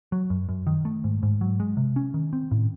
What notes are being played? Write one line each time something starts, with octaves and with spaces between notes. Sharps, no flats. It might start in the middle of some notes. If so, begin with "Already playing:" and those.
F#3
F#2
F#2
D#3
A3
G#2
G#2
F#3
G#3
C3
C#4
D#3
C4
A2